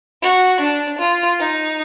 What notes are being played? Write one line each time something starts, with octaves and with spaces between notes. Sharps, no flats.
F#4
D4
F4
D#4